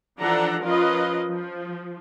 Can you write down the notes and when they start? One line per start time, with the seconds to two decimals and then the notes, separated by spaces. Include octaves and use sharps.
0.20 E3 F3 D4 A4 F#5 A#5
0.62 F3 C#4 F4 A#4 B4 D#5
1.29 F3